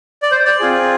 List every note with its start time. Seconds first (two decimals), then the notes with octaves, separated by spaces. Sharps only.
0.22 D5
0.31 C5
0.45 D5
0.60 C4 F4 G#4